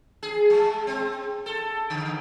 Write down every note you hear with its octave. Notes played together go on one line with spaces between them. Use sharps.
G#4
G#3
C4
A4
D3